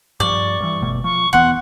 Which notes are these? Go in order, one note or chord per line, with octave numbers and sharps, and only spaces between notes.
G2 F3 D5 C#6
G2 E3
F#1 B2 A3
F3 C#6
E1 E3 B3 F#5 C6